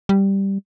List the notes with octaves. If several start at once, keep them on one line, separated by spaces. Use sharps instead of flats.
G3